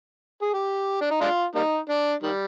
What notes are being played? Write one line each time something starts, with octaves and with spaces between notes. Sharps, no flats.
G#4
G4
D4
D#4
G#3 D4 F4
G3 A#3 D#4
D4
D#3 G3